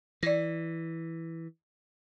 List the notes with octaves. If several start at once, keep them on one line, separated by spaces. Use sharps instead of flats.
E3 D5 A#6